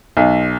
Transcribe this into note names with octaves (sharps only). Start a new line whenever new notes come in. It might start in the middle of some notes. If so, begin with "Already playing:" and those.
B1